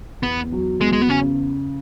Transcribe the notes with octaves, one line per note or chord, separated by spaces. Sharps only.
E2 B3
F#3
E2 G#3
G#3
B3
C#3 C#4